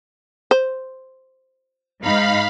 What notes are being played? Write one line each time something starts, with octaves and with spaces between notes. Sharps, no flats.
C5
G#2 D#4 F5 B5